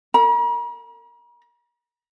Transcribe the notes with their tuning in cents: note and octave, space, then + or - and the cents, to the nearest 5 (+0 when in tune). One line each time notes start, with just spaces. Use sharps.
A#4 -40 A#5 +45